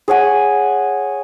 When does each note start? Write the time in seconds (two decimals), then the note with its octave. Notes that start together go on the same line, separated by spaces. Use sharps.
0.08 G#4 C#5 F#5 G#5